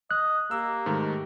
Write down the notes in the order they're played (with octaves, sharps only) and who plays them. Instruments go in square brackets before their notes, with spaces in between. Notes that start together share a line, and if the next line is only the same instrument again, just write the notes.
[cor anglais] D#5 [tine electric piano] F#6
[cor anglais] A#3 [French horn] G4 [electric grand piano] E6
[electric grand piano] G#2 D#3 A3